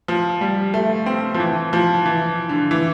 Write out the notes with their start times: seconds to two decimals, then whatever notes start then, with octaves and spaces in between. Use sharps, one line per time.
0.08 F3
0.41 G3
0.74 A3
1.06 C4
1.34 F3
1.40 E3
1.73 F3
2.06 E3
2.49 D3
2.71 E3